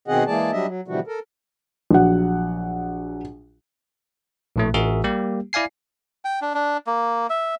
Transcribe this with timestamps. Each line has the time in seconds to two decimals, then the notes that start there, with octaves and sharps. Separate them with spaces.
0.08 B2 D#3 C4 G#4 D#5 F#5
0.27 E3 G#3 A#3 G#4 D5 A5
0.52 F#3 G3 D4 D#5 E5
0.66 F#3
0.88 B2 D3 E3 F3 G3 F#4
1.07 A4 A#4
1.91 A#1 F#3 F#5
4.56 A#1 A2 A3
4.74 A1 F#4 G#4 A#4 E5
5.04 G3 A#3 G4
5.53 E4 D5 F5 G#5 C7
6.25 G5
6.41 D4
6.54 D4
6.87 A#3
7.30 E5